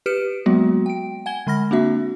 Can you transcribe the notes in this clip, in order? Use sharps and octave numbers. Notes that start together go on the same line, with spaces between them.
G4 B4 F6 C#7 D7 E7
F#3 G#3 A#3 B3 F#4
G5 D7
F#5 G#5 G#6 G7
D3 G#3 B5 F6 A#6
A#3 C4 D4 F#4 E5